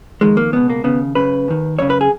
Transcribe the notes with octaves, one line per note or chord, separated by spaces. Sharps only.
F2 D#3 G#3
A#3
C#2 B2 B3
A#3
D#2 C#3 B3
F#2 C#3 B4
D#2 D#3
F#2 C#3 C#5
B4
G#4